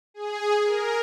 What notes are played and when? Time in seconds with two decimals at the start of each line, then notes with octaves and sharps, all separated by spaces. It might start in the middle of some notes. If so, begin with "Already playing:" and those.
0.14 G#4
0.64 A#4